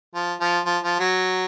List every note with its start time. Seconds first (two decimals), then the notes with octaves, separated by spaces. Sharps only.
0.15 F3
0.41 F3
0.66 F3
0.84 F3
1.00 F#3